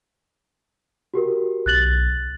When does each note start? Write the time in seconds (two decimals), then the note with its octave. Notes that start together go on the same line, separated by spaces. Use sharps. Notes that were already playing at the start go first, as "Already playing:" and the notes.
1.14 F#4 G4 A#4
1.66 B1 F#6 A6 F#7